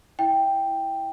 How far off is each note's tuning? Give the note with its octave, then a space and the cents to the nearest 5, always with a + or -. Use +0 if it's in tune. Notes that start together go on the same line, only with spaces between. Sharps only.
E4 -5 E5 +0 G5 +0